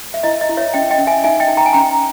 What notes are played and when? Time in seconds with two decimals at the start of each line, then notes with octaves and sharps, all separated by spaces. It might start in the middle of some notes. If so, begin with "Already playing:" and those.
0.14 E5
0.23 E4 D#5
0.41 D#5
0.49 E4
0.57 C#5 E5
0.74 C#4 D#5 G5
0.91 D#5 G5
0.98 C#4
1.07 E5 G#5
1.24 D#4 E5 G#5
1.40 D#5 G5
1.48 D#4
1.57 G5 A#5
1.66 G#5
1.73 C#4 G5 A#5